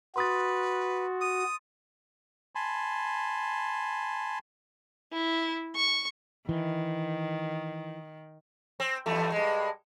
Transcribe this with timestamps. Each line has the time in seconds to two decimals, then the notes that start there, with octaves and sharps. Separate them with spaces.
0.16 F#4 B4 C6 D#6 A6
1.21 D#6
2.55 G#5 A5 B5 C6
5.13 E4
5.76 C#6
6.49 D#3 E3
8.80 C4
9.06 E2 G2 A3
9.32 G2 G#3